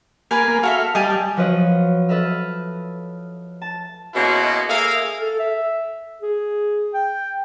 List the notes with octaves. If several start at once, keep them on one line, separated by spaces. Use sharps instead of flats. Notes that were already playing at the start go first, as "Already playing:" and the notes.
A#3 A#4 B4 G#5
A#3
F#4 A4 E5 F5
G3 D#5 G#5 A5
F3 F#3 B4 C#5 D#5
A4 B4 D#5 E5 F6
A5
B2 G#3 A#3 C#4 E4 F#4
A#3 G#4 A4 E5 F5
A4
E5
G#4
G5